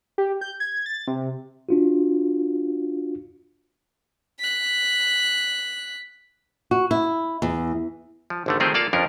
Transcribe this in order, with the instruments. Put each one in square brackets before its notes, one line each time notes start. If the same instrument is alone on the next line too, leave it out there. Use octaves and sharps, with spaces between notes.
[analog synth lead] G4
G6
G#6
A6
C3
[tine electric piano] D4 F4 F#4
[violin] F#6 B6
[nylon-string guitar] F#4
E4
E2
[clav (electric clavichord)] F3
G#1 D3 A3
D#3 F3 A3 C4 G4 G#4
A#3 F4 A4 D5 F5 A5
F2 F3 C#4 D4 A#4